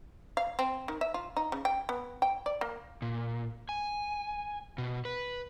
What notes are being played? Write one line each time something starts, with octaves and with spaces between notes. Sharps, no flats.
F5
C4
D#3
E5
F4
D#4
C#3
G5
B3
G5
D5
A#3
A#2
G#5
B2
B4